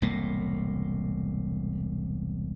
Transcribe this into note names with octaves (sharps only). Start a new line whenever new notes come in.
E1 C2 A2 A#3